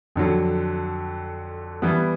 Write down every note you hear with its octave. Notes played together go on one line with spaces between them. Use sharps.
F2 D3 F#3
E3 G3 B3